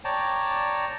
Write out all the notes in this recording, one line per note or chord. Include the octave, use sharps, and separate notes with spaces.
C#5 D5 G5 A5 A#5